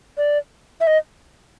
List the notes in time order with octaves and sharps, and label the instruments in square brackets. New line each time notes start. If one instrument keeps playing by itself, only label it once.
[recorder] D5
E5
D#5